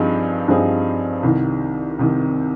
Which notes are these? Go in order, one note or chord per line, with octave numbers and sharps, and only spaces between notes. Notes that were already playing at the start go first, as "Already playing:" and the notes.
Already playing: G2 F3 C4 D#4 G#4
G2 F3 C4 D#4 G#4
C2 C3 D#3
C2 C3 D#3